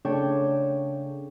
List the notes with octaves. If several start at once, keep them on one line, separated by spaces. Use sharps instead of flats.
C#3 A3 D4 C#5 G5